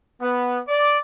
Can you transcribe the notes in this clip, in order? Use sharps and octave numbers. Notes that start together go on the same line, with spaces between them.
B3
D5